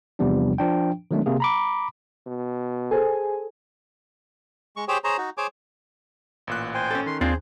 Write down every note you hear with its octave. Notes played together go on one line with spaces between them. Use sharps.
E2 C3 F3 G3 B3 D4
F3 D4 G5
D#3 F#3 G#3 A3 B3 D4
C3 A#3 G#4
A#5 B5 D6
B2
G#4 A4 C5 G#5
G#3 C#6
G4 G#4 C5 C#5 G5
G#4 C5 C#5 A#5
D#4 F#4
G#4 C5 C#5 G#5 D6
A1 A#2 F#6
C5 G5 G#5
C#4 A4
D#3 C6
D#2 C4 D4 F4 G#4 C5